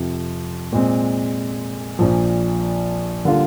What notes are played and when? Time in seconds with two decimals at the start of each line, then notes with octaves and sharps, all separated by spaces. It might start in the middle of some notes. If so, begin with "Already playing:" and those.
Already playing: F2 C3 F3
0.73 A#2 G#3 C4
1.99 A#1 A#2 F3
3.25 D3 G3 A#3 F4 A#4